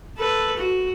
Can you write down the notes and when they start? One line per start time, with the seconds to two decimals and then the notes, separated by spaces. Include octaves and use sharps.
0.17 A4 B4
0.57 F#4